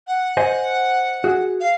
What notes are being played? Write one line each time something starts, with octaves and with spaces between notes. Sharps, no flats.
F#5
C5 D#5 G#5
F#4 G#4
F5